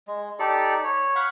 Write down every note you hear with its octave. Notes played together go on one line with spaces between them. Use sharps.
G#3
D#4 G4 A4 D5
C#5
F5 F#5 B5 C#6